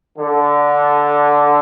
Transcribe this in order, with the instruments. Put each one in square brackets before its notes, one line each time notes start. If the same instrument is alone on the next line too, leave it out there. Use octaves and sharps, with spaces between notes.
[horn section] D3